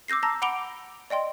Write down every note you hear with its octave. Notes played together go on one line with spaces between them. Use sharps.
D6 E6 G6 A#6 C7
A5 A#5 E6 A#6
F#5 B5 D6 D7 F7 G7
D5 D#5 G5 C6